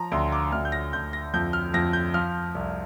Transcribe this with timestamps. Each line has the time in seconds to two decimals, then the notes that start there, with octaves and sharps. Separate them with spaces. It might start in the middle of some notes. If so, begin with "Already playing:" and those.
Already playing: F3 A#5
0.12 D2 C6
0.32 D6
0.52 D2 F6
0.65 G6
0.72 A#6
0.93 D2 G6
1.13 A#6
1.34 F2 G6
1.53 F6
1.74 F2 A#6
1.93 G6
2.14 F3 F6
2.55 C2